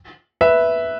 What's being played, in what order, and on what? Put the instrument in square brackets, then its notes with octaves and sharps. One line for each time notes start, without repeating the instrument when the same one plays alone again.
[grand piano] B4 E5